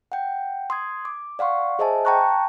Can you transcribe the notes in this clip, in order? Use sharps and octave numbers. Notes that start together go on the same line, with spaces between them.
F#5 G5
C6 D#6 G#6
D6
D5 F5 F#5 C6 C#6
G#4 C5 D#5 E5 G#5 A5
G5 A5 A#5 C#6 F#6